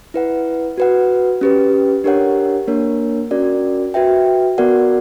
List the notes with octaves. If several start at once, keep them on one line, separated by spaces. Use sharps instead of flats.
E4 B4 F#5
F#4 B4 F#5
C#4 G4 B4
D4 G4 A#4 C#5 F#5
A#3 D4 A#4 C#5
C#4 F#4 A#4 D5
F#4 B4 E5 G5
B3 F#4 A#4 D5 F#5